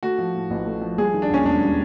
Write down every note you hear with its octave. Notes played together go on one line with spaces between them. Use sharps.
A3 F#4
F3
A2
A1
A3
F3
G3 G#4
D#3
D4
D#2 C#4
E1 D4
G3